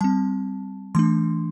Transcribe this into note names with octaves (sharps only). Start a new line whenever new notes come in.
G3 C4 A5
E3 A3 D4 C6